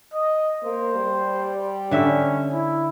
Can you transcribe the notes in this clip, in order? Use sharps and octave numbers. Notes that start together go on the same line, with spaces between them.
D#5
A#3 C5
G3
D3 C#4 E5
E4